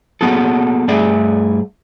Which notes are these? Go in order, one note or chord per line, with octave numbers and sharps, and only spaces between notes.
A#3 B3 F#4 G#4 A4
G2 A3 G#4 D5 E5